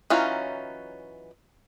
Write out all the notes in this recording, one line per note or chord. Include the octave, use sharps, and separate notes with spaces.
E3 F#3 C#4 D#4 F4